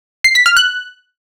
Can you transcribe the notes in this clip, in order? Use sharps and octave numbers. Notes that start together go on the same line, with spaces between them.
C7
B6
F6
F#6